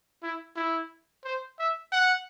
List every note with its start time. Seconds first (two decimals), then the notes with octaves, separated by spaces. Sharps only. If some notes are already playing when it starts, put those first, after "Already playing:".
0.23 E4
0.56 E4
1.25 C5
1.59 E5
1.92 F#5